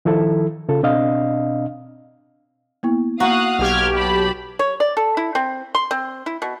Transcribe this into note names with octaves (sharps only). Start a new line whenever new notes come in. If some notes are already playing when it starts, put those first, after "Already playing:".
D#3 F3 E4 A4
C#3 F4 A4
B2 C4 D4 D#5 F5
A#3 B3 E4
A#3 F#4 F5 A#5 D#6 F#6
B1 G4 F6 G#6
A5 B5
C#5
D5
A4
E4
C4
C6
C4
E4
B2